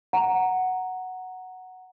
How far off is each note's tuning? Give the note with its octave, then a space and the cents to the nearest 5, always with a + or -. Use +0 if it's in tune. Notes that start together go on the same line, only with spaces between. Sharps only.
F#5 +0 A#5 +0